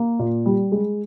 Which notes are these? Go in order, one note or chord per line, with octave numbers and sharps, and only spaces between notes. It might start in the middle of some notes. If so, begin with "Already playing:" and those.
Already playing: A#3
A#2
G3
G#3